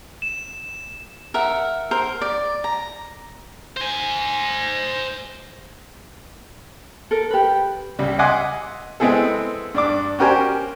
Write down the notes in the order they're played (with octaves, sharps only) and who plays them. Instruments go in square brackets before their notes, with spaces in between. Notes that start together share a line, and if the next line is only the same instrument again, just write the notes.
[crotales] E7
[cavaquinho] A#4 E5 F#5
A#4 C5
D5
A#5
[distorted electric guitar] C5 G#5
[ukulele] A4 A#4
G4 B4
[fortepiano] C#2 G3
D#5 E5 F#5 G#5 C6 D6
G#3 B3 C4 E4 G#4 A4
G2 D4 D6
C#4 F#4 G4 A#4 C5 G#5